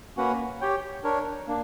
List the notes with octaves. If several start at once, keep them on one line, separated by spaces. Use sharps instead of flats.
A#3 C#4 F#4 B4 F#5
G4 C#5 G5
D4 A#4 C#5
A#3 D4